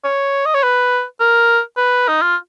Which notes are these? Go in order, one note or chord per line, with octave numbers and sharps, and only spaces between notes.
C#5
D#5
C#5
B4
A#4
B4
D#4
F4